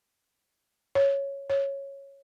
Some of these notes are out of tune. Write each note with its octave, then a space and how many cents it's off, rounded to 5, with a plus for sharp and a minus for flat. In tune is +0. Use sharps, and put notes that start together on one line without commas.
C#5 +0
C#5 -5